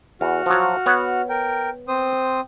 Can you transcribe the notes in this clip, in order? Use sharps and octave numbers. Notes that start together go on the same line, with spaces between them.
E2 F#4 F6
F3 F#3
B3 C#5 F#5
A#4 G5
C4 C5 D#6